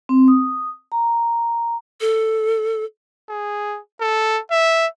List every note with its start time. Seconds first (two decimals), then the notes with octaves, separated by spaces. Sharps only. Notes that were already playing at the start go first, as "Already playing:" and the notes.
0.09 C4
0.28 D#6
0.92 A#5
2.01 A4
3.29 G#4
4.01 A4
4.51 E5